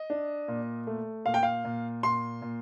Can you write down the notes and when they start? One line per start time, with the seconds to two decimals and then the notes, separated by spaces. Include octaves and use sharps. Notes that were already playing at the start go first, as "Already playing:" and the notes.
Already playing: D#5
0.10 D4
0.48 A#2
0.87 A3
1.26 A#2 F5
1.34 G5
1.43 F5
1.65 A#2
2.03 A#2 C6
2.42 A#2